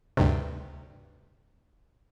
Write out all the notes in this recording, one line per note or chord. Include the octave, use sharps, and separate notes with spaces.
D2 G2 C3